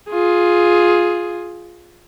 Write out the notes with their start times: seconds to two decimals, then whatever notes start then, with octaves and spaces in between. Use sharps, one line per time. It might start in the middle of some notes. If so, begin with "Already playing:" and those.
0.10 F4 G#4